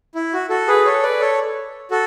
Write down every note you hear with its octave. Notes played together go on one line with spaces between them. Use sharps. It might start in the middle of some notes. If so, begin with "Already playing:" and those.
E4
F#4
F#4 A4
G#4 B4
A4 C#5
B4 D5
A4 C#5
F#4 A4